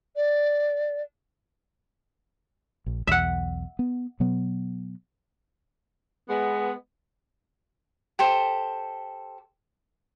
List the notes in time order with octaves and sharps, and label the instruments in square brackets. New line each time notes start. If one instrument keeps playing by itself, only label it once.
[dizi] D5
[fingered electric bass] A#1
[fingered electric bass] B1 E2 [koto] E5 F#5
[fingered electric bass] B3
B2 F#3 B3
[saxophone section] G#3 B3
[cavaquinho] G4 A4 C5